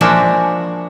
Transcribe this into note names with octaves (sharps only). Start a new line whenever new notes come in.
F3 G#3 A#3 D4 F#4 E5